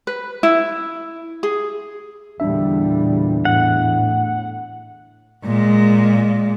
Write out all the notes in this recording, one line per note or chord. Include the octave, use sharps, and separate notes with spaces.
B4
E4
G#4
E2 A#2 D3 G3 D4 E5
A2 F#5
A#2 G#3